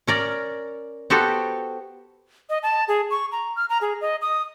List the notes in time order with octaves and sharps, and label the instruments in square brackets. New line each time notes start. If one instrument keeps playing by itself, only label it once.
[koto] C#4 A#4 D5
B3 F#4 G4 A4 C5
[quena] D#5
A5
G#4
C#6
A#5
F6
A#5
G#4
D#5
D#6